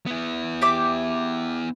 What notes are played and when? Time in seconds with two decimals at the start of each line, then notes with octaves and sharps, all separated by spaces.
0.06 B3 E4
0.62 G4 E5 D6